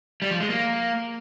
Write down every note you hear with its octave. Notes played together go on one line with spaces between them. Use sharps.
G3
F3
G#3
A#3